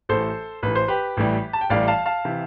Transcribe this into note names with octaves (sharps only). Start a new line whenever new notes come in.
A1 A2 E3 A4 C5
A1 A2 E3 B4
C5
G4 B4
A1 A2 E3 G3
A5
G5
A1 A2 E3 G3 D5 F5
F5 A5
F5 A5
C3 E3